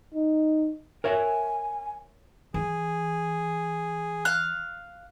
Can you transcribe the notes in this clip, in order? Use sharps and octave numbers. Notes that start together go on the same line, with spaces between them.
D#4
A#4 C#5 E5 G#5
E3 G#4
F5 F#6